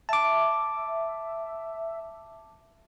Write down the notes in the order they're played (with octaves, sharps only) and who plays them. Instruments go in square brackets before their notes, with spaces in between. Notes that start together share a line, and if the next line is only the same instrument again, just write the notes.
[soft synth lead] E5 [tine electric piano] A5 D6